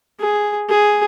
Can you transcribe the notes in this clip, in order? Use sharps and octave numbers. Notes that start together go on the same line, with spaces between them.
G#4
G#4